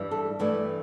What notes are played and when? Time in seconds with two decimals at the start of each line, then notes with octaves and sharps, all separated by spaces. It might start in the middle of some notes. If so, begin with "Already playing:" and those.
Already playing: G2 E3 G3
0.11 A4
0.40 G2 E3 A3 D5